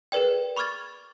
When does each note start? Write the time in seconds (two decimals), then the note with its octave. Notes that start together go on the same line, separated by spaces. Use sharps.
0.12 G#4 A#4 B4 D5 G5
0.56 B5 C#6 D6 F6 G#6 A6